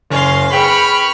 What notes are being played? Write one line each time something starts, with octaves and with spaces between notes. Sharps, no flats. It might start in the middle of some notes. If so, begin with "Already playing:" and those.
F#1 C#4 F5 C6
G#4 B4 G5 B5 C#6 F6